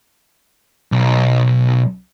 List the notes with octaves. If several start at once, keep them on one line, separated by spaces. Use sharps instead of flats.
B1